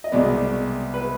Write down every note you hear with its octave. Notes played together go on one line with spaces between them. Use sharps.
D#5
C2 B2 G#3 B3 D5
B4